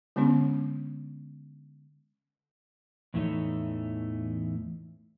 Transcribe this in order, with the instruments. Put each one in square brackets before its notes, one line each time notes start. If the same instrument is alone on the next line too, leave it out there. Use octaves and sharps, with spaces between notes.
[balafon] D3 G#3 B3 C#4 D4
[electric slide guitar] E2 A2 E3 A3 D#4 C#5